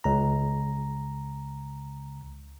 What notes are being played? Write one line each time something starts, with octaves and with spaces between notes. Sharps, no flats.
C#2 A#5